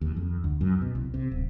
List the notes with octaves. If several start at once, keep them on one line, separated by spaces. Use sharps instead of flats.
D#2
F2
D2
F#2
B2
C2
C3
D1